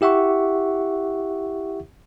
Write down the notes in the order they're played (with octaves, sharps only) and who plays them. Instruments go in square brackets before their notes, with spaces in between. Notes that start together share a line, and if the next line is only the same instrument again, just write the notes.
[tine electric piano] E4 G4 E5 F#5 C#6